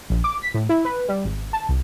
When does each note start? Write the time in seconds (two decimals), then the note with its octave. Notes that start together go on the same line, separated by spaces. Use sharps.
0.10 A#1
0.24 D6
0.42 B6
0.54 A2
0.69 E4
0.85 B4
1.08 G3
1.24 G#1
1.53 A5
1.69 C2